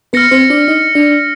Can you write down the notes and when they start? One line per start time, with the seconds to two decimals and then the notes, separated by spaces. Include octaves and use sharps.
0.13 B3 B4 F6 A#6 C#7
0.31 C4 C5
0.50 D4 D5
0.68 D#4 D#5
0.95 D4 D5